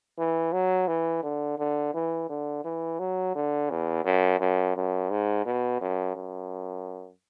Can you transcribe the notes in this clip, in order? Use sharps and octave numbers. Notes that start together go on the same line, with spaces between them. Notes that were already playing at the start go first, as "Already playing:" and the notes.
E3
F#3
E3
D3
D3
E3
D3
E3
F#3
D3
E2
F#2
F#2
F#2
G#2
B2
F#2
F#2